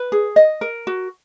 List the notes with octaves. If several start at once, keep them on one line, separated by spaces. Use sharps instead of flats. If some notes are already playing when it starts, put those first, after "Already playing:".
Already playing: B4
G#4
D#5
A#4
F#4